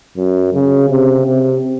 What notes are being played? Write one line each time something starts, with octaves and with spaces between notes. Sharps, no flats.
F#2
C#3
C3
C3